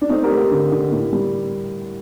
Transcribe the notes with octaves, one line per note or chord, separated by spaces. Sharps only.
D4
A3 C4 D#4
G4 A#4
A3
G4 A#4
D3
D3
A2
G3